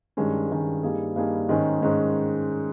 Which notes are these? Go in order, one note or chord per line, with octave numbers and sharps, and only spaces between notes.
G2 D#3 G#3 C#4
G2 D#3 G#3 C#4
G2 G3 A#3 D#4 G#4
G2 G3 A#3 D#4 G#4
G#2 D#3 G#3 C#4
G#2 D#3 G#3 C#4